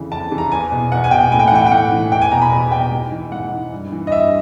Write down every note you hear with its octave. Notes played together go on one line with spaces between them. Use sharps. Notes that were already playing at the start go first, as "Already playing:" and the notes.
Already playing: F2 C#3 E3
F2 A5
C#3 E3
A#5
E2 G#5
B2
E2 F#5
G#5
B2 G5
A2 G#5
G5
F#5
E3 G5
G5
A2 F#5
E3
E2 G5
G#5
B2 A#5
B5
E2
B2 G5
G#2
E3
G#2 F#5
E3
G2
E3
D#5
G2 E5